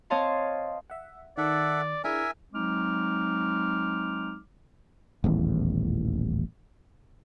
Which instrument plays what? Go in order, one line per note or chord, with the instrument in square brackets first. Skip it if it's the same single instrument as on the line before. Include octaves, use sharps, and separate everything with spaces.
[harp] C4 C#5 D#5 F5 A5 C6
[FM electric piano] E5 F#5
[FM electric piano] D#3 [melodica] A4 E5 F#5 [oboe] D5
[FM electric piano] D4 E4 G#4 [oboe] A#4 [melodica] E5 G#5
[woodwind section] F#3 G#3 C4 D#4 D6 F6
[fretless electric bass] D#1 A1 E2